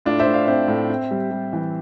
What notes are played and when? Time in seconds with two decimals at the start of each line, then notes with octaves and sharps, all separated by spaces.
0.05 A2 D4 F4
0.19 C5 E5
0.27 A2
0.34 D5 F5
0.47 C4 C5 E5
0.68 A2
0.90 C4
1.11 G3
1.31 G3
1.53 E3